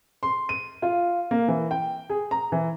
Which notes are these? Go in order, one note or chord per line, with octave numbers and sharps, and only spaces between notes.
C6
D#7
F4
A#3
E3
G5
G#4
A#5
E3